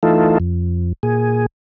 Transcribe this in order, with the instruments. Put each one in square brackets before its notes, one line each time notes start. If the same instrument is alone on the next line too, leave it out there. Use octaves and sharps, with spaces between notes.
[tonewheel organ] E3 A3 D#4 F4 A4
F2
A#2 G#4